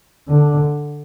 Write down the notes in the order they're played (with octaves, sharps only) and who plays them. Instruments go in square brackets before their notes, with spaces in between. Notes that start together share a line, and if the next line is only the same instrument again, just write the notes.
[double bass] D3